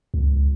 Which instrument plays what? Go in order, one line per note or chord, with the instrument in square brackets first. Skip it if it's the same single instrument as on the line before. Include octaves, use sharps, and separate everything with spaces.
[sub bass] C#2